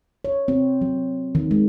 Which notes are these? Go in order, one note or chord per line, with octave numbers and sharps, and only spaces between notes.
C#5
C4
F#3
D#3
G#3